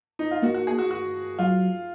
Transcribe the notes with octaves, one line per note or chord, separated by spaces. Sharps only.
D#4
F4
A#3 F#4
F#4
G#4
F#4
F#4
F#3 F4